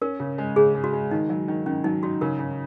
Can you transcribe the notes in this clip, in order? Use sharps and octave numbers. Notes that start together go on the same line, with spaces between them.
C#4 A#4
C#3
G#3
C#3 G#4
G#3
F#4
G#3
D#3 D#4
F#3
D#3
D#3 C#4
F#3 D#4
D#4 F#4
C#3 A#4
C#3